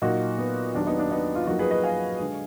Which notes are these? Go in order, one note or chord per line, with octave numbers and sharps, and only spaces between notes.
A#2 F#3 A#3 D#4 F#4
B3
D#2 D#3 F#3 D4
B3 D#4
D4
B3 D#4
F4
F#2 F3 A#3 D#4 F#4
G#4 B4
B4 D#5
F5 G#5
D3 G#3